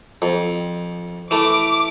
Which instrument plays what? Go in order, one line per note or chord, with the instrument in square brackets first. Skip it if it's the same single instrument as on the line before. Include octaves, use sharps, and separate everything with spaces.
[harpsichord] F2
[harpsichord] E3 A3 [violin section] D6